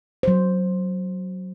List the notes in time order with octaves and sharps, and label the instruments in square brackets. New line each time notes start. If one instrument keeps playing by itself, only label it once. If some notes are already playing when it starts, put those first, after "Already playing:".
[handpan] F#3 C5